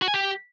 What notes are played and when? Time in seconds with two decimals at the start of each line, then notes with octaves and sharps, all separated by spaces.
0.02 F#4
0.08 G#5
0.14 G4